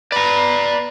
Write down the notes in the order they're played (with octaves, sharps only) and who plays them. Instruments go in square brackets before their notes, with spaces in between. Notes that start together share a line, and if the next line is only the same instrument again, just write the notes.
[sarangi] B4 [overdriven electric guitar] D5 A#5